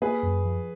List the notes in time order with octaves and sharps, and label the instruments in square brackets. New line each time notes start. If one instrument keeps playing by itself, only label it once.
[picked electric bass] A#3 [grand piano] G#4 B4
[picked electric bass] F#2
F3